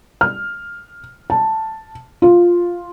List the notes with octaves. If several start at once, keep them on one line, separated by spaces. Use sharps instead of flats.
F6
A5
F4